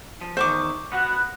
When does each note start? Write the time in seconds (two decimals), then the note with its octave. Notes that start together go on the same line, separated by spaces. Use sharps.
0.21 F3
0.37 E2 D#3 C5 C#6 D6
0.92 B3 F#4 F#5